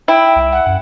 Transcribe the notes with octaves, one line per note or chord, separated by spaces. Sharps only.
E4 G5
C2
F#5
F#2